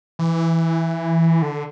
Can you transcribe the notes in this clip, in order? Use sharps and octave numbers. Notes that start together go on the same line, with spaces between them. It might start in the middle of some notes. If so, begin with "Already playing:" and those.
E3
D3